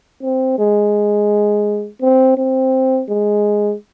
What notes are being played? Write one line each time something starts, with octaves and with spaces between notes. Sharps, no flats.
C4
G#3
C4
C4
G#3